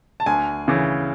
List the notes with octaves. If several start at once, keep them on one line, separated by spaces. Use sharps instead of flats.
A5
D2 G#5
C#3 E3